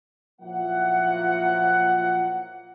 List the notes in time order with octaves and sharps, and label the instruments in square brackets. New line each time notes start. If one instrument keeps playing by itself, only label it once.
[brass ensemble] A#2 F3 F#3 A#3 E4 F#5